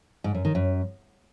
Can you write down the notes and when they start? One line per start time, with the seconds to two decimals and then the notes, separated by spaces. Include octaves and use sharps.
0.24 G#2
0.35 F#2
0.45 D#3
0.55 F#2